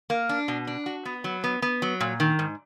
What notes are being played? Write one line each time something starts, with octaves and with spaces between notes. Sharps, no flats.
A#3
D4
B2
D4
F#4
B3
F#3
B3
B3
F#3
A#2
D#3
G#2